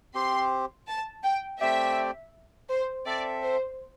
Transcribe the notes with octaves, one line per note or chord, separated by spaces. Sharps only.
C4 G4 C5 C6
A5
G5
A3 C4 G4 D5 E5 G5
C5
C4 A4 D5 E5
C5